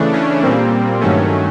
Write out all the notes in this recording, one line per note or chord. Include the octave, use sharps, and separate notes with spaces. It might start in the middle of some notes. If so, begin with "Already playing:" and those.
Already playing: C#3 E3 A3 D4
C#4
A#2 G3 A#3 C4
G2 D#3 F#3 A3 C#4